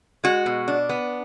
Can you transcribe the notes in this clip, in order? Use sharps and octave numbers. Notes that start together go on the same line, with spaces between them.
G#3 F#4
B2
D4
B3